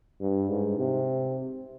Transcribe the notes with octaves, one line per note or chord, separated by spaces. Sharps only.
G2
G#2
C3